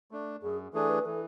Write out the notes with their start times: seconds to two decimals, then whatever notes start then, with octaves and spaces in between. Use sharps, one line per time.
0.11 A3 D4
0.43 F#2 G#4
0.73 E3 A3 D4 G#4 A4
0.90 B4
1.05 E3 A4